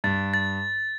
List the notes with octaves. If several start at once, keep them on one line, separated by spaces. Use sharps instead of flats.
G2 A6
A6